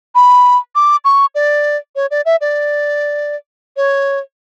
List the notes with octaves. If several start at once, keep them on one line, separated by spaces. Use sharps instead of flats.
B5
D6
C#6
D5
C#5
D5
E5
D5
C#5